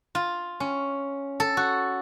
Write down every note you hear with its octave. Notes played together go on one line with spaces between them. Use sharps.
F4
C#4
A4
F#4